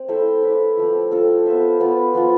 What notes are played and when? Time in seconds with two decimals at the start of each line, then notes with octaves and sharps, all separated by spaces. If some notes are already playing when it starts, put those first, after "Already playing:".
Already playing: C4
0.08 A3 E4 A4 C5
0.43 E4 B4 D5
0.77 F3 A3 C4
1.11 C4 F4 A4 C5
1.46 B3 F4 C5 E5
1.80 B3 F4 B4 D5
2.14 F3 B3 F4 C5